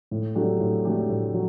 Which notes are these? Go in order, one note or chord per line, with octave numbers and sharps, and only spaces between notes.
A2
F#3 A3 D4 G4
A2
F#3 A3 D4 G4
A2
F#3